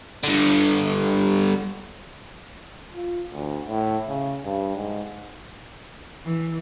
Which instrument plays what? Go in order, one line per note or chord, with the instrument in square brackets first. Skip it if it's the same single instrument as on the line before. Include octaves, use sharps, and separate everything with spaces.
[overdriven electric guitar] G2 D3
[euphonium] F4
D2
A2
C#3
G2
G#2
[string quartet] E3